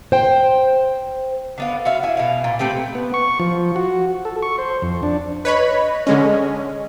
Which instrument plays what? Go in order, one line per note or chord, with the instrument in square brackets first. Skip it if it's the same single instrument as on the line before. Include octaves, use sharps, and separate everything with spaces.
[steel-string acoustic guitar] C5 G5
[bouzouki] D3 B3 F5
F#4 E5 F5
E4 G#5
B2 F5
A#2
A3 C4 G4 B4
[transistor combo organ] B3
C#6
F3
F#4
A4
C#6
C5
F2
D4
[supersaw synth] B4 C#5 B5 [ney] D#5
[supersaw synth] D3 G#3 C#4